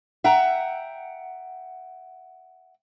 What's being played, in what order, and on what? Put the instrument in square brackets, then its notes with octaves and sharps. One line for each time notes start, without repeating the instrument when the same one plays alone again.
[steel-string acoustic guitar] E5 F#5 G5 A#5